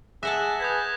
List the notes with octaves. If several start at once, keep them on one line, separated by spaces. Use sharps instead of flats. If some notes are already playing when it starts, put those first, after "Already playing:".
G#4 E5 F#5 A5 F#6 A#6 E7
B4 G#5 D#6 G6 B6